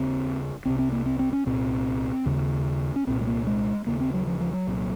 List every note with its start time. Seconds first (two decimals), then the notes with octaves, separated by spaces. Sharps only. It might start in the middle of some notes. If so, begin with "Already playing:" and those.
Already playing: D#2 C#3 C4
0.65 C2 C3 C4
0.79 C4
0.92 A#3
1.06 C4
1.19 C4
1.33 C#4
1.46 C2 A#2 C4
2.26 D#2 C#3
2.96 C#4
3.07 C2 A#2 C4
3.21 G#3
3.27 A#3
3.47 G#3
3.86 D#2 C#3 A#3
4.00 C4
4.14 F#3
4.27 F3
4.40 F3
4.53 F#3
4.67 C2 A#2